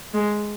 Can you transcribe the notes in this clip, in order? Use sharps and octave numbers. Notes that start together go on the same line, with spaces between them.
G#3